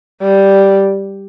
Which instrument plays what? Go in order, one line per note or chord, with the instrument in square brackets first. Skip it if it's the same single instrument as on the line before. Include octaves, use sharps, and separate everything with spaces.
[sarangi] G3